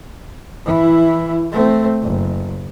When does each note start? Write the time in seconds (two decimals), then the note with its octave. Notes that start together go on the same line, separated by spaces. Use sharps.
0.65 E3 E4
1.52 A3 C4
2.02 F#1